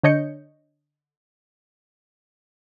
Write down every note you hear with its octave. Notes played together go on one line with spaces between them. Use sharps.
D3 D4 C#5 D#5 G6 C#7